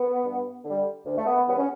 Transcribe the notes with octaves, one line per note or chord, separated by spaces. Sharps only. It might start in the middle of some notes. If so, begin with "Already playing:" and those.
Already playing: B3
G2
D3 G3
D2
A3
B3
C#3 E3 G3 B3
C#4